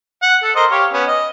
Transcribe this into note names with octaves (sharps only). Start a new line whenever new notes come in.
F#5
A4
A#4 C5 D#5
G4 C#5 F5
B3 C#4
D#5